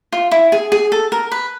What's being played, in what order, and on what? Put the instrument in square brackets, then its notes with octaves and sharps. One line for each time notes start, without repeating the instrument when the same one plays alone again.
[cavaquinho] F4
E4
G#4
G#4
A4
A#4
B4